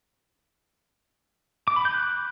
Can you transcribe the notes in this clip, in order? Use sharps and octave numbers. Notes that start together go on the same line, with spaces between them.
D6
B5
G6
F#6